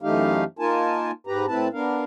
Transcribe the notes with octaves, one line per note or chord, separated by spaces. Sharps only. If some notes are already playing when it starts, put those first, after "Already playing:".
F#2 E3 A3 D#4 G4 F5
A#3 D#4 F4 A#4 G#5 A5
G#2 G4 B4 A#5
A2 C4 E4 B4 A5
B3 D4 A#4 F5